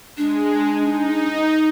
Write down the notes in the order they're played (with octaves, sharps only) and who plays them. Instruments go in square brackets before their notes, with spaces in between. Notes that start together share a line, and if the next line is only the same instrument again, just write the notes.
[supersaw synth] G#3 [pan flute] D4
[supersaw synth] D#4